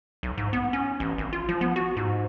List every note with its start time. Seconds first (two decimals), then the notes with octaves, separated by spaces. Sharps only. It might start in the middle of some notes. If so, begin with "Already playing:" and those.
0.23 B1
0.37 G#2
0.53 B3
0.73 C#4
1.00 A1
1.18 G#1
1.33 F4
1.49 F3
1.61 B3
1.76 F#4
1.97 G#2